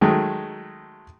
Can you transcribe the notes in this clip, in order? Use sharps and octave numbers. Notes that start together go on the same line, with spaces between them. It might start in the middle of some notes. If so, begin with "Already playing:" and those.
D#3 F#3 G#3 A3